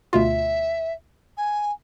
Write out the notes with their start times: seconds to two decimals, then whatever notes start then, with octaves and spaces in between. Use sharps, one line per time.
0.13 D2 B2 F4 E5
1.37 G#5